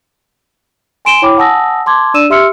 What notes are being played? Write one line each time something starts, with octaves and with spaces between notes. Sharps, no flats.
G#5 C6 D7 E7 G7
E4 C#5 G5 B5 D6
F#5 G#5 A5 D#6 E6 A#6
A5 C6 D6 G#6
D4 D5 E6 D#7 E7
G4 E5 C6 E6 F6 C#7